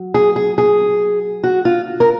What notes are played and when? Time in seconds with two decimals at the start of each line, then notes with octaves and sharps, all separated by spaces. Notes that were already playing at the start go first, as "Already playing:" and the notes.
Already playing: F#3
0.14 G#4
0.36 G#4
0.58 G#4
1.44 F#4
1.65 F4
2.00 A#4